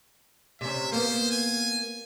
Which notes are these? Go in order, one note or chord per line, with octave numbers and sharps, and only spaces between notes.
C3 C#4 E5
A#3 B3 C5
G#5